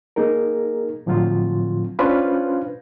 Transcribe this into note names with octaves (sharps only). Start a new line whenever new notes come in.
A#3 D#4 G#4 A#4
A2 D3 F3 F#3 C4 F4
C#4 D4 F4 B4 C5 F5